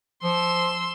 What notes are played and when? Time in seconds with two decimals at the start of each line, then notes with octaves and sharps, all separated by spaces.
0.23 F3 C6 E6